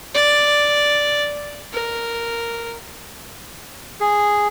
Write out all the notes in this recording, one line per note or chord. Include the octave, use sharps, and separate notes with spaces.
D5
A#4
G#4